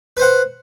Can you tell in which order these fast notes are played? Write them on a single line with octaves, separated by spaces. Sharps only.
B4 C5 F#5